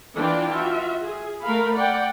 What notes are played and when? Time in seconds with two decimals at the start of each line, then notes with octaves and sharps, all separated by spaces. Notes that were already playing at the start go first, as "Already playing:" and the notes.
0.17 E3 D4 F4 D5 G5 A5
0.52 F4 F#4 E5
1.02 G#4
1.44 A3 A#4 F5 B5
1.75 D5 F#5 G5